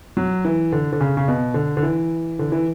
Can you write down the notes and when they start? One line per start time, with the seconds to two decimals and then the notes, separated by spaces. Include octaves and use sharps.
0.17 F#3
0.45 E3
0.72 D3
0.92 D3
1.00 C#3
1.17 C#3
1.28 B2
1.54 D3
1.77 D3
1.83 E3
2.39 D3
2.52 E3